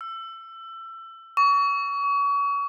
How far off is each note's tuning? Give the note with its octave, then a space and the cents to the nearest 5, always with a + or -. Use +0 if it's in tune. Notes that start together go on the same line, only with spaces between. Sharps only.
E6 +25
C#6 +35
C#6 +35